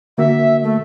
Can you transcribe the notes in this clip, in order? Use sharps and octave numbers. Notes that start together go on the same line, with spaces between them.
D3 A#3 F#4 E5
A3